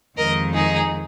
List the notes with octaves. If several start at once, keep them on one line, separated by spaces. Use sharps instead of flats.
F2 D#3 G#3 A#4 D#5
D#4 G#4